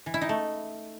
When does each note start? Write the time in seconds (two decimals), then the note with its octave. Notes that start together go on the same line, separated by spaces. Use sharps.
0.06 E3
0.14 E4
0.21 D#4
0.29 A3